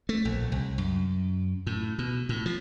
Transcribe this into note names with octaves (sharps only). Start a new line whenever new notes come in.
A3
A#1
C2
F#2
A2
B2
A2
F3